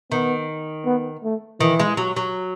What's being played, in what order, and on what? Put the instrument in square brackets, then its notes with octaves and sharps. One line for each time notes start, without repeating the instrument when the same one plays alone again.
[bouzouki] D#3 [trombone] B3
[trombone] B3
A3
[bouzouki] D#3 [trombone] E3
[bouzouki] G#3
F#3
F#3